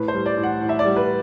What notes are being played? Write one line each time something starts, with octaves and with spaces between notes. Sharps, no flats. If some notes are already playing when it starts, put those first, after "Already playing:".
Already playing: A2 B4
C5
G3
D5
A2
F#5
A2
E5
D5
G3
B4